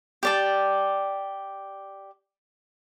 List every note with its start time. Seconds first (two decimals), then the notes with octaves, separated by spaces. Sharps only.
0.23 G4 D5 A5